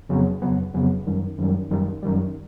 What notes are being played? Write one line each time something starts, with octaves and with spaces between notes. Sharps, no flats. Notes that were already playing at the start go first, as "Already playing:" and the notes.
F2 C#3 F#3 B3
F2 C#3 F#3 B3
F2 C#3 F#3 B3
F#2 D#3 G3
F#2 D#3 G3
F#2 D#3 G3
F#2 D#3 G3